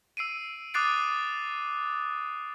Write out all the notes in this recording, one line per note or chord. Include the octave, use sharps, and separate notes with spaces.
E6 C7 D7 D#7
D6 D#6 F#6 A6 C7 D7